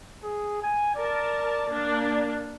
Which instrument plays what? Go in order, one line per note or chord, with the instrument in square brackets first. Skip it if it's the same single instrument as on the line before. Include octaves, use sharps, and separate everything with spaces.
[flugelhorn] G#4
G#5
[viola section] A#4 A5 [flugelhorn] D5
[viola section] A#3 D4